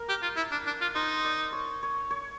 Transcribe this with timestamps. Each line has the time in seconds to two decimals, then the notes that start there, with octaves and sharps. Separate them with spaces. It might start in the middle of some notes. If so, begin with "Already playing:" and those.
Already playing: A#4
0.09 G4
0.23 F4
0.37 E4
0.52 D4
0.66 D4
0.81 F4
0.95 D#4 C5
1.25 D5
1.53 C#5
1.83 C#5
2.10 C#5